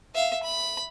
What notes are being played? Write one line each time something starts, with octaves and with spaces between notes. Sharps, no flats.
E5 F5
B5